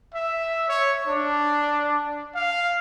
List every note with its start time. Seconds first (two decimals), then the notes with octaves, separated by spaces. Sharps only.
0.14 E5
0.69 C#5
1.08 D4
2.35 F5